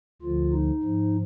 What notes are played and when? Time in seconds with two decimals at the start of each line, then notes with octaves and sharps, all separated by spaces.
0.22 D2 D3 F3 F4
0.53 D#4
0.83 G#2 F3